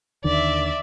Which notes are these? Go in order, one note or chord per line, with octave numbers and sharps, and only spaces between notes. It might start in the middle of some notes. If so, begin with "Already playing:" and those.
D#2 D3 D#3 D5 E5